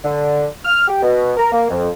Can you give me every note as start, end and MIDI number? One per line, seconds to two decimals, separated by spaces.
0.04 0.46 50
0.65 0.87 89
0.88 0.99 67
1.03 1.31 47
1.37 1.48 70
1.52 1.66 58
1.70 1.89 41